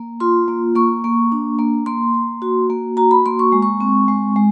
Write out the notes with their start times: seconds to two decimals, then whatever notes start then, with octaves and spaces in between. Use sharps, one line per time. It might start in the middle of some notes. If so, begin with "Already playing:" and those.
Already playing: A#3
0.20 F4 C6
0.48 A#3
0.76 A#3 C#6
1.04 A#3
1.32 D4
1.59 A#3
1.86 A#3 C6
2.14 A#3
2.42 F#4
2.70 A#3
2.97 F#4 A#5
3.11 B5
3.26 A#3 C6
3.39 C#6
3.52 G#3
3.62 C#6
3.81 C4
4.08 G#3
4.36 G#3